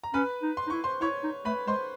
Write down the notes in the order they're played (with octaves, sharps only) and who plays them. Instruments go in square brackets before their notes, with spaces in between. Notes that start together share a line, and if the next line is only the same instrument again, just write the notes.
[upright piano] A#5
[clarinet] C#4 [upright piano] B4 B5
[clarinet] D#4
[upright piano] C6
[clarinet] D#4
[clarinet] E4 [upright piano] C#6
[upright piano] C5 C6
[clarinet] E4 [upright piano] C#5 C#6
[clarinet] D#4
[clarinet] A3 [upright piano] B4 B5
[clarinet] G#3 [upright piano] C5 C6